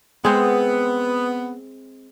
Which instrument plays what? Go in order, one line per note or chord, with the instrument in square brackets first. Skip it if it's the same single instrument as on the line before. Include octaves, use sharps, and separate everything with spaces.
[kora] G#3 C4 [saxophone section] B3